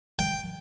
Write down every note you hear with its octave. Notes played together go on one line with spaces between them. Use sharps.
G5